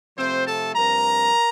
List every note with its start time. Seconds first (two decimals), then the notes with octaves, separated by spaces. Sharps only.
0.18 C3 F3 A3 C4 C5
0.46 A4 A5
0.75 G2 F3 C4 A#4 A#5